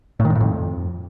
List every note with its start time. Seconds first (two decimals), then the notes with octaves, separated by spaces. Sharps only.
0.20 A2
0.25 D#3
0.30 G#2
0.35 A2
0.41 F2